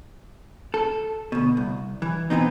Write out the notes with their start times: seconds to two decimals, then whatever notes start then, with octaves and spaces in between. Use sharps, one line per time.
0.74 A4
1.32 D2 B2
1.57 C2
2.02 E3
2.30 E3 F3 B3 C4 D#4